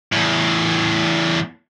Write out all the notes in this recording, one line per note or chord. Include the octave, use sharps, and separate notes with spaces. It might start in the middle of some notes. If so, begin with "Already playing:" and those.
E2 A2